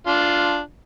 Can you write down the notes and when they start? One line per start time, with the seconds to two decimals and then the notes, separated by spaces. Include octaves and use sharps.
0.07 D4 F4